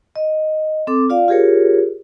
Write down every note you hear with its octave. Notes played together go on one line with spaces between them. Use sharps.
D#5
C4 A4 D6
F4 D5 F5
F4 G4 G#4 A#4 C#5